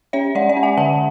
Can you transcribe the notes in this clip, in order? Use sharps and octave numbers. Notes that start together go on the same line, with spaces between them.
C#4 C#5 E5
G#3 D5 F#5
D5 F#5
C#4
E5 G#5
D3 F#5 A5